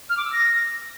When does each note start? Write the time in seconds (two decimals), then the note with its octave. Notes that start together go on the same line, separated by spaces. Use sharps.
0.09 F6
0.17 D6
0.24 E6
0.32 A#6